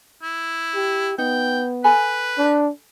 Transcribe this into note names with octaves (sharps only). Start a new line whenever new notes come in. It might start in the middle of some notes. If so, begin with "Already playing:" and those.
E4
G4
B3 D#4 G5
A4 B4 G#5 B5
D4